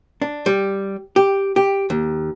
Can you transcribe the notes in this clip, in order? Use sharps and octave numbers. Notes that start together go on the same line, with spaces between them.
D4
G3
G4
G4
D#2